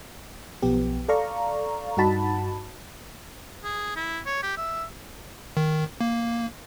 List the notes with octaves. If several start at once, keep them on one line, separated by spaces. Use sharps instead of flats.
B1 F3 B3 G4
A4 D5 F5 A#5 C#6
G2 D#4 F#4 A5 B5
G#4
E4
C#5
G4
E5
D#3
A#3